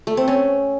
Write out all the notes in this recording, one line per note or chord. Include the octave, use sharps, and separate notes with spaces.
A3
C4
C#4